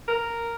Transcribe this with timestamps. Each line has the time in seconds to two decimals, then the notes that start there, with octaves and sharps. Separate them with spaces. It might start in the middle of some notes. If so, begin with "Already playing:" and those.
0.08 A#4